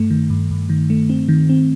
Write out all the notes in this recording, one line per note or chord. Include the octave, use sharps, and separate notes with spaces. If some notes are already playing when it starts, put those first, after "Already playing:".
Already playing: G2 A3
D#3
G2
G2
D#3
A3
C4
D#3
C4